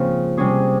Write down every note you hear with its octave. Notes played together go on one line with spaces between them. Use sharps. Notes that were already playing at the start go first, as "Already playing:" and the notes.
Already playing: G#2 C#3 F3 A#3 C4
C3 G3 C#4 G#4